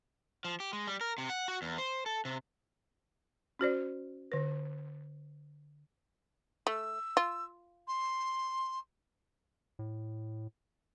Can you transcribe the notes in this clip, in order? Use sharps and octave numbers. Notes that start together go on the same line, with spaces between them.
F3
G4
G#3
G3
A#4
C3
F#5
F#4
E2
C5
A4
C3
C#4 F#4 C5 D5
D3 B4
A3 E6
F4
C6
A2